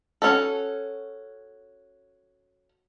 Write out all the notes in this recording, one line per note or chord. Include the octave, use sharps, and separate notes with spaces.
C#4 F#4 A4